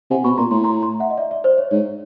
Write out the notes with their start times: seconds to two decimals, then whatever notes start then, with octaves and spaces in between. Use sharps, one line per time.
0.11 C3 F#5 G#5
0.24 B2 B5 C#6
0.38 A#2 A#5 C6
0.51 A2 A#5 C6
0.64 A#5 C6
0.82 A#5 C6
1.00 E5 F#5
1.10 D#5
1.18 D5 E5
1.31 D5 E5
1.44 C5 D5
1.58 C#5
1.71 G#2 C#5